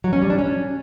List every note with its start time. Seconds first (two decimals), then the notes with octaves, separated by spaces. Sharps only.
0.04 F#3
0.13 C#4
0.21 G3
0.30 D4
0.38 C#4